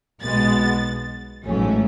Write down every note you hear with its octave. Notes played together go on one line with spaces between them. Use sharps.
B1 B2 G#3 B3 A6
A1 G#2 F#3 A3 C#4